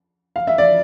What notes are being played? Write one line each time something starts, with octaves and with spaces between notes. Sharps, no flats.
F5
E5
D5